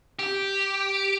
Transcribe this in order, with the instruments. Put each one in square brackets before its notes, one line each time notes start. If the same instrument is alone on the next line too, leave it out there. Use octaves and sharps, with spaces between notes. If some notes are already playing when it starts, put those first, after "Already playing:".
[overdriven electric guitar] G4